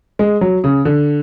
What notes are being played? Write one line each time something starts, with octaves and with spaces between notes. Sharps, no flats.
G#3
F#3
C#3
D3